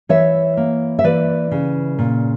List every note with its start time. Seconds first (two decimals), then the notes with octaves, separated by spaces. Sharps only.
0.09 E3 C#5 E5
0.57 A#3
0.99 E5
1.04 E3 B4 D5
1.51 C#3
1.99 A#2